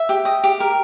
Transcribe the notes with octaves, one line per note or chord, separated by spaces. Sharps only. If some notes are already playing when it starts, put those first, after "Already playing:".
Already playing: E5
G4
D#5
G4
A#4